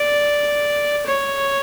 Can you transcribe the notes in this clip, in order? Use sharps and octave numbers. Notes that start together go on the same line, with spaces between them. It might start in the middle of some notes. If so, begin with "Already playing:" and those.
Already playing: D5
C#5